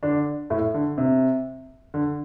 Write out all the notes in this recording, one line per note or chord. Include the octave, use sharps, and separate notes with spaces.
D3 D4
A2 A3
D3
C3
D3